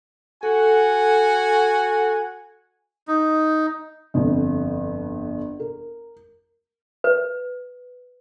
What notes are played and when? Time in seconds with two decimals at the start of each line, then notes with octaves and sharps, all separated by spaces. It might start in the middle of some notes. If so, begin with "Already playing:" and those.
0.43 F#4 A4 F#5 G#5
3.08 D#4
4.14 G1 F2
5.60 A#4
7.04 B4